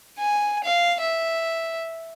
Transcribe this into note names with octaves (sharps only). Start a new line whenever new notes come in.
G#5
F5
E5